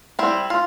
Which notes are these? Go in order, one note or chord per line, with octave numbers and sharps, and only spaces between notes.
G3 C4 E4
F4